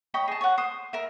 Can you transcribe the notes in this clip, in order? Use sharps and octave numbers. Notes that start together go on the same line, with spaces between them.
C#5 D#5 G5 B5
G#4 A5
C#5 F#5
C5 D#6
A#4 E5